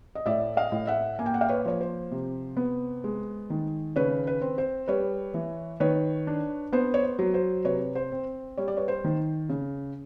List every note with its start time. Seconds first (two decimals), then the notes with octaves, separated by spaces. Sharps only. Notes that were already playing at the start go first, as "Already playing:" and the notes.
0.15 D#5
0.26 A2 D5 E5
0.57 D#5 F5
0.72 A2
0.87 E5 F#5
1.19 A#3 G#5
1.26 G5
1.34 F#5
1.41 F5 G5
1.49 B4 C#5
1.65 F3 C#5
1.81 C5
2.11 C3
2.57 B3
3.04 G#3
3.50 D#3
3.96 C#3 B4 C#5
4.27 B4
4.41 C4
4.58 C5
4.88 G3 B4 C#5
5.34 E3
5.80 D#3 B4 C#5
6.27 D4
6.73 B3 C5
6.94 C#5
7.03 C5
7.19 F#3
7.34 C5
7.65 C3 B4 C#5
7.95 C5
8.12 C4
8.57 G3 C#5
8.68 D5
8.77 B4 C#5
8.88 C5
9.04 D#3
9.49 C#3